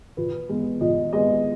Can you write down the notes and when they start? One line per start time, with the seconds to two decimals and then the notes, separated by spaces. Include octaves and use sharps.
0.17 A#2 B4
0.49 G#3 B3
0.81 A#2 D#5
1.13 G#3 B3 D#5